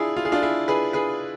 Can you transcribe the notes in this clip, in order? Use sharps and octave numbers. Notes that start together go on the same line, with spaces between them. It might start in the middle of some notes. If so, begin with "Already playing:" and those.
Already playing: D4 E4 F4 G#4
F4
G#4
D4 F4
E4 G#4
G#4 B4
G#4 B4